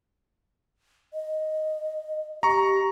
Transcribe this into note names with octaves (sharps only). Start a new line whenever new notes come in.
D#5
G4 A#5 C#6